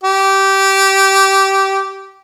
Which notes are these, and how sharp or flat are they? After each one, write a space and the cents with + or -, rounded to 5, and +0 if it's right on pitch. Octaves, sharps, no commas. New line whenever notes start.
G4 -15